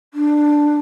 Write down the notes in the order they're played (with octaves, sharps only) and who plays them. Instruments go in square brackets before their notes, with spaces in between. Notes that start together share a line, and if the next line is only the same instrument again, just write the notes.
[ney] D4